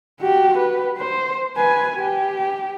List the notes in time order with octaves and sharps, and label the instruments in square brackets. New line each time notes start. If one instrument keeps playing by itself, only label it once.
[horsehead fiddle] F#4 G4
B4
C5
B4 G#5
G4